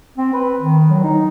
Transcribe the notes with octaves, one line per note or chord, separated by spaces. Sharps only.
C4
B4
D#3
F#3
D#4